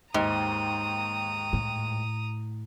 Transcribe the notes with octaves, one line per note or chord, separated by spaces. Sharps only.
D#2 G#2 A#5 D#6
A2